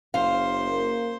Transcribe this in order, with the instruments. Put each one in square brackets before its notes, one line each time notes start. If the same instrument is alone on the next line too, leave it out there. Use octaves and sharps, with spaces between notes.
[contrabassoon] F#1 [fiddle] C5 [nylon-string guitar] F5
[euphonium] A#3